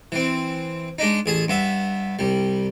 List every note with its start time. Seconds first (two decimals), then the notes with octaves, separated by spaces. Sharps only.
0.12 E3 C4
0.99 G#3 D4 D#4
1.26 A1 G#4 A5
1.48 G2 B3 E5
2.19 C2 G3